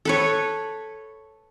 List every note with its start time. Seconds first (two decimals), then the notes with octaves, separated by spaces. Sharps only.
0.05 A4 B4 C#5